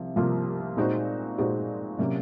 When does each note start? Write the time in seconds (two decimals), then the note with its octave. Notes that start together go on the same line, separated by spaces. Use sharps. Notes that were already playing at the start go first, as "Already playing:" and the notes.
Already playing: C2 C3 F3
0.16 C2 C3 F3 A#3 F4
0.77 A#2 G#3 D#4 F#4 C5
1.38 A#2 G#3 D#4 F#4 C5
1.98 C3 F#3 A#3 C#4